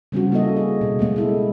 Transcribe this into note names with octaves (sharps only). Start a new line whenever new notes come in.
C#3 G3 C4 C#4 F#4
A#3 E4 A4 D#5
G#4
B2
B2 G#3 A3 B3
E4 A4